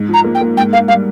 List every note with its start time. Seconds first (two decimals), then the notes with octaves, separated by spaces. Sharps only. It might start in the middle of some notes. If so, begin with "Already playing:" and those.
Already playing: G#2
0.08 F3 A#5
0.24 A#3
0.34 G5
0.41 A#3
0.57 G#2 G5
0.73 A#3 F5
0.88 G3 F5